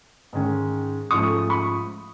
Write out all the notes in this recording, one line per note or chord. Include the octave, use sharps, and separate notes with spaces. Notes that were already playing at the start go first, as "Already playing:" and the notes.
G#2 D#3 G#3 C#4
G#2 F3 A3 C#4 C#6 D#6
B5 C#6